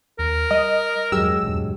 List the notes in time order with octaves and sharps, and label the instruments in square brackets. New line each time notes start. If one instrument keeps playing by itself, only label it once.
[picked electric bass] D#2 [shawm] A#4
[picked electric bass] G3 [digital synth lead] D#5
[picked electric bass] E2 G2 [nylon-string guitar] F#3 G#3 G4 [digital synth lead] E6
[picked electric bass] D#1 E2 G2